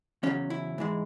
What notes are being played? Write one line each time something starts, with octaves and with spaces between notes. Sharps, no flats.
E2 C#3 F#3 C#4
E4
G#2 E3 G#3